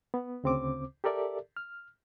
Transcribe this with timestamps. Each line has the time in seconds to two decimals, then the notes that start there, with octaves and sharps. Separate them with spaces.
0.14 B3
0.44 D2 C#3 C4 C5 D6
1.04 G4 A4 A#4 D5 E5
1.57 F6